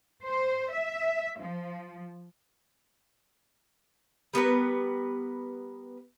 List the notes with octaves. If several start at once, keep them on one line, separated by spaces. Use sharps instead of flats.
C5
E5
F3
G3 B3 A#4 B4